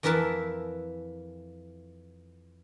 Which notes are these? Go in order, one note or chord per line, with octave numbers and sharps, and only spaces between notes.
F2 E3 E4 A#4 B4 A5